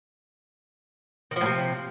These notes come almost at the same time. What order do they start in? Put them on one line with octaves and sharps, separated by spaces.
D#3 F3 A2 C3